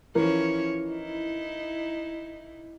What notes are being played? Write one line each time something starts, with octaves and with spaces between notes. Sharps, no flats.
E3 F3 C#4 A#4 C#5
D#4 E4